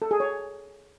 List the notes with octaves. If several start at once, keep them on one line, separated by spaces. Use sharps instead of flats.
A4
G#4
C#5